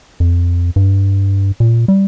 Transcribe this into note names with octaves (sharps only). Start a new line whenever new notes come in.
F2
G2
A#2
G3